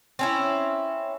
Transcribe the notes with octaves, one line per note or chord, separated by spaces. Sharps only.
C4 C#4 E4